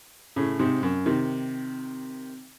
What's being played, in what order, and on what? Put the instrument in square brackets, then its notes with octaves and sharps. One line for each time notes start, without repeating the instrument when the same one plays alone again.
[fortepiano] A2 C#3
G#2 C3
F#2
C3 D#3